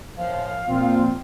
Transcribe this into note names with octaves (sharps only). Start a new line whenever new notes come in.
F#2 A2 F3 F5
A#2 F3 C4 F4